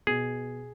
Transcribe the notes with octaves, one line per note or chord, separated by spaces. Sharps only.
B2 G#4